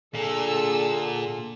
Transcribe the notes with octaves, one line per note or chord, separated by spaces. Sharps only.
A#2 D3 G#4 A4 E6